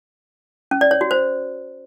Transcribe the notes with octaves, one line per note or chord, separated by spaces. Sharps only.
C#4
D5
C#5
F#4
C5